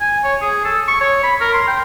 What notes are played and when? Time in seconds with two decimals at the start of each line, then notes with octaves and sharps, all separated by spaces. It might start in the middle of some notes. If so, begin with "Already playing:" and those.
0.01 G#5
0.24 C#5
0.41 G#4
0.65 A4
0.88 C#6
1.01 C#5
1.24 B5
1.41 A#4
1.54 C6
1.68 G5